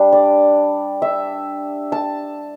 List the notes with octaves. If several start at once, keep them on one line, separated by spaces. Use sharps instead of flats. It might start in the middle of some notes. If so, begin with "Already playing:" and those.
Already playing: G3 D4
D5
E5
A5